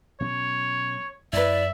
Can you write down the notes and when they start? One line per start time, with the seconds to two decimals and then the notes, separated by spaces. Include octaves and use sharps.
0.20 B2 F#3 C#4 C#5
1.33 F#2 E4 B4 D5 E5